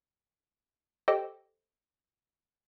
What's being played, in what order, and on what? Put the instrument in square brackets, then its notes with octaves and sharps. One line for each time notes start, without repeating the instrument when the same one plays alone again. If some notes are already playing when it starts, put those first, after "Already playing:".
[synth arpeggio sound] G4 A4 C5 D#5 G5